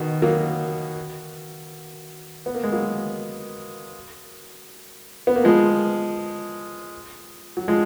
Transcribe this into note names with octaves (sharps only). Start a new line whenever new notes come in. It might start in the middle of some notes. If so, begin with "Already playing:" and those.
Already playing: B2 D#3
F#3 A#3
B3
A#3
G#3
F#3 A#3
B3
A#3
F3 G#3
F#3
F3 G#3